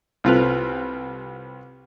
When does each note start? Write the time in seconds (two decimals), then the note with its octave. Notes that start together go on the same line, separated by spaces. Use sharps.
0.24 C2 C4 F4 A4 B4 F6